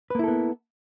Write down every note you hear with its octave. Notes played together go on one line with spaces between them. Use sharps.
A#3 B3 E4 A4 B4